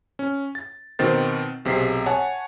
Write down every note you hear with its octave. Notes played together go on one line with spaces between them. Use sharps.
C#4
A6
B2 D#3 C4 C5 A6
B1 C3 G#4 B6 C7
C#5 F#5 G#5 A5